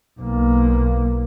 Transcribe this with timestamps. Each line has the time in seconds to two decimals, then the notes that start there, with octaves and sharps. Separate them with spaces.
0.20 B1 A#3